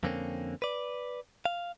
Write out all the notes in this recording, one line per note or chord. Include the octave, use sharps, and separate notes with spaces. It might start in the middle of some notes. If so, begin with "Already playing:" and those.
F2 D3 A#3 C4 C#4
B4 D5
F5